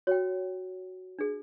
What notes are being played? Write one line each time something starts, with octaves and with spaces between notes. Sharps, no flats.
F#4 C#5 G5
D4 G#4